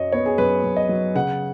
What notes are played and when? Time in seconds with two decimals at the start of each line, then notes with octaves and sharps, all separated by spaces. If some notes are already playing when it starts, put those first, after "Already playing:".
Already playing: F#2 F#3 C#5 D#5
0.12 B3 C#5
0.26 G#4
0.38 F#2 B4
0.64 F#2
0.77 D#5
0.89 F#3
1.15 C#3 F#5